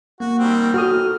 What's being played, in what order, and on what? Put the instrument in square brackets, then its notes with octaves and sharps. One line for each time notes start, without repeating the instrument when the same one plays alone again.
[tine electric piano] A#3 [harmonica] F#4
[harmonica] D#3 G3 C4
[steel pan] F#4 D#6 [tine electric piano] A4 [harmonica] F6